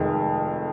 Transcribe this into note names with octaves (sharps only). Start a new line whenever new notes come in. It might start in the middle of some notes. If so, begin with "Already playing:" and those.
Already playing: F1 F2 D#3 G#3